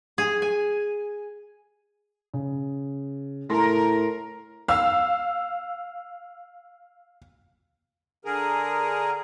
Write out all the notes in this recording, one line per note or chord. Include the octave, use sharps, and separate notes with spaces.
G#4
G#5
C#3
A2 A#4 A5 C6 A#6
F5 E6
D3 G#4 A#4